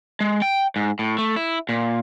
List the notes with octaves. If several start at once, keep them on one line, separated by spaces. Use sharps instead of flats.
G#3
G5
G#2
A2
A3
E4
A#2